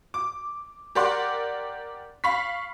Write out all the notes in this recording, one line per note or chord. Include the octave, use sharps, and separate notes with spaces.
D6
G4 A#4 D5 F#5 C6 F#6
F5 B5 C#6 B6